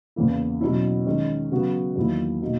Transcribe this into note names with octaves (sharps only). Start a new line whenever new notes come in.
E2 C#3 E3 A#3 E4
B2 F#3 C#4 E4
D#3 G#3 C#4
C#3 F#3 B3 F#4
E2 D#3 F#3 A#3 E4
B2 A#3 D#4 F#4